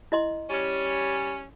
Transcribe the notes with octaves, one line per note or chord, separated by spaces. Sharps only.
E4 D#5 C6
G3 C#4